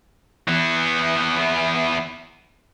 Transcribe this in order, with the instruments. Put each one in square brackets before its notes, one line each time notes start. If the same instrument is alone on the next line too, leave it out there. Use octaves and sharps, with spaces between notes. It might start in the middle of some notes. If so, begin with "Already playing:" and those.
[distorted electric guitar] E3 B3